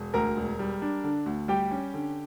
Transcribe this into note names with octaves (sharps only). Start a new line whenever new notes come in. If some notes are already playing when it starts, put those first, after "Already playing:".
Already playing: E1
D2 A#4 A#5
E1
G3
D4
D3
D2
G3 G4 G5
C#4
D3